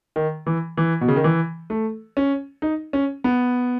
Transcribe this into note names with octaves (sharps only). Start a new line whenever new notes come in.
D#3
E3
E3
B2
C#3
D#3
E3
A3
C#4
D#4
C#4
B3